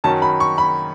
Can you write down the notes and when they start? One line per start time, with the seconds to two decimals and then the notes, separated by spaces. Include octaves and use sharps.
0.04 F#2 D#3 F#3 C#4 A5
0.22 B5
0.40 C#6
0.58 B5